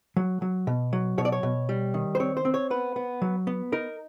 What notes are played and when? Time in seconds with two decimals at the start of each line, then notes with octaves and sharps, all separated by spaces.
0.17 F#3
0.42 F#3
0.67 B2
0.93 F#3
1.18 B2 C#5
1.25 D5
1.32 C#5
1.43 B2
1.69 G3
1.94 D#3
2.15 C5
2.20 C4 C#5
2.37 C5
2.45 C4
2.54 C#5
2.70 B3 B4
2.96 B3
3.22 F#3
3.47 B3
3.72 D#4 A#4